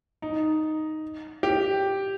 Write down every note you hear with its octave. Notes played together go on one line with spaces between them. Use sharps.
D#4
G4